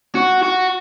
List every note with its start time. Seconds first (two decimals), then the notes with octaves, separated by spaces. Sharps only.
0.15 F#4
0.43 F#4